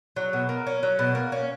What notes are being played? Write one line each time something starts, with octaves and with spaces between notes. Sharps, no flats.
F#3
B2
A#3
C#4
F#3
B2
A#3
C#4